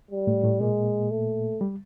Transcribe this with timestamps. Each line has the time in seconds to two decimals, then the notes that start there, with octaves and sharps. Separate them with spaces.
0.11 G3
0.27 A2 A3
0.44 A2 A3
0.60 A#2 G#3 A#3
1.11 A3
1.61 G3